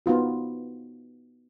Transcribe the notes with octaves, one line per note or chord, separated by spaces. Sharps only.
B3 D#4 F4 F#4